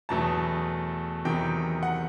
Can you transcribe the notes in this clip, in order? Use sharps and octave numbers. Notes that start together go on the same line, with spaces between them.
E2 B2 F#3 A3 A5
E2 C3 D#3 F#3 G5
F#5